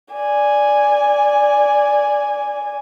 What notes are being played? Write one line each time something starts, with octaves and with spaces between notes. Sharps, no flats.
D5 G#5